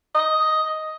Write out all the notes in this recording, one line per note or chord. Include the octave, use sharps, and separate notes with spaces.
D#5